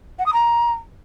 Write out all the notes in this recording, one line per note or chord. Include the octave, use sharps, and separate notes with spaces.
F#5
D#6
A#5